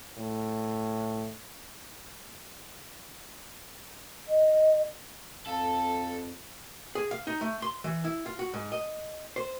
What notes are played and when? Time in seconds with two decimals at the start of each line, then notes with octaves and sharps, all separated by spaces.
0.17 A2
4.28 D#5
5.47 F2 A4 F5 A5
6.95 G#4
7.11 F5
7.27 D#4
7.41 A3
7.62 C6
7.84 E3
8.05 E4
8.26 F4
8.39 F#4
8.54 G#2
8.72 D#5
9.36 C5